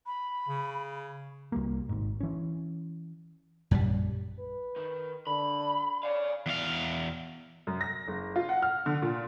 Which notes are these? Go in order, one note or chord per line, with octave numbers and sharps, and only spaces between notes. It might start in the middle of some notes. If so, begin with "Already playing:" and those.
B5
C#3
C2 G3 A#3
G#1 G#2
E3 C#4
A#1 F#2 G3
B4
D#3
D3 B5
D5 F5 G#5
E2 F5
F#2
A#6
F#1
F4
F#5
F6
D3
A#2